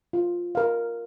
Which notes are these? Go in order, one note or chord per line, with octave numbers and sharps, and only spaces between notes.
F4
A#4 F5